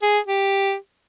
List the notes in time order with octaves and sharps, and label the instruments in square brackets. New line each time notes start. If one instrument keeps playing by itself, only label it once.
[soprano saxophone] G#4
G4